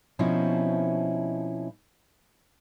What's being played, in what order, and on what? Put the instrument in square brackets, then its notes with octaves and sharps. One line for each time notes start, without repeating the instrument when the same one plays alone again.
[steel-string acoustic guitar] B2 F3 C4 C#4 D#4 E4